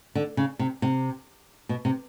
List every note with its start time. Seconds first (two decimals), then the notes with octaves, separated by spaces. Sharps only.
0.15 D3
0.37 C#3
0.59 C3
0.82 C3
1.69 B2
1.85 C3